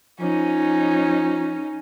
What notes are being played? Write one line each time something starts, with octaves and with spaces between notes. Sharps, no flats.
F3 C#4 D#4